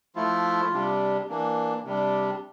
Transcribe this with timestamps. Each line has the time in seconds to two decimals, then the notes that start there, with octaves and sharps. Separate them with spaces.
0.16 F3 A3 E4 F4
0.72 C3 G3 D4
1.29 E3 A#3 D4
1.85 C3 G3 D4